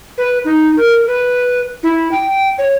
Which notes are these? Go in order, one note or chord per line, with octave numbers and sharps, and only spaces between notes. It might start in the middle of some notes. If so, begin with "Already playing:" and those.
B4
D#4
A#4
B4
E4
G5
C#5